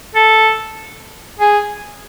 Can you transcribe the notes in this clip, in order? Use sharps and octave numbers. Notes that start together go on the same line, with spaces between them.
A4
G#4